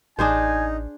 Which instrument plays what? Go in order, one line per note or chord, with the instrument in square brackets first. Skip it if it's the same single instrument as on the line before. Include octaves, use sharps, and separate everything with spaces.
[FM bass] A1 [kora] D4 G#4 C5 [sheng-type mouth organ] D#4 [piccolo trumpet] G#5